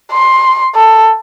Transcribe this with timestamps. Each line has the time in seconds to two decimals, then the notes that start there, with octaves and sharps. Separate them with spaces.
0.12 C6
0.75 A4